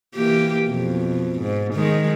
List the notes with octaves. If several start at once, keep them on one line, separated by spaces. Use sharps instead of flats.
E3 A#3 G4
F2 B2
G#2
D#3 G#3